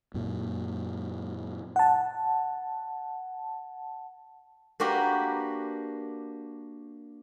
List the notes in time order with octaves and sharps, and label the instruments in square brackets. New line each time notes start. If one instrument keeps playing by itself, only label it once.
[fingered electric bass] F#2 A#2
[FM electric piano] F#5 A5
[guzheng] A#3 D4 F#4 G4 A#4 B4